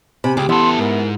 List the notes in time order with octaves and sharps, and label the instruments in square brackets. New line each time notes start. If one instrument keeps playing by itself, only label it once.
[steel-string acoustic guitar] C3 [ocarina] G#5 [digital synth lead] B5
[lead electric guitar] C#2 [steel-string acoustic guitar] G#4 [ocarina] G5 [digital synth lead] D6
[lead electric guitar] E2 A4 [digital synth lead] B3 [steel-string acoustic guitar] E4 [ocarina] C6
[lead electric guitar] G#2 [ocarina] A#4